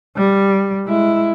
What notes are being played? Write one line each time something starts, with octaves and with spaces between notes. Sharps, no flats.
G3
G#3 E4